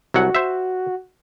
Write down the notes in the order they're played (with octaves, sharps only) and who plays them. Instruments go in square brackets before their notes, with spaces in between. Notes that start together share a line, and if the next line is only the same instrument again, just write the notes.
[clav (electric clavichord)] C2 F#3 F#5 [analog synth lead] F#4
[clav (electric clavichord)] C5 E5